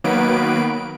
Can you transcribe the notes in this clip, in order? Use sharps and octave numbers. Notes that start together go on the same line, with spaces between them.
D#3 F#3 A#3 B3 B4 D7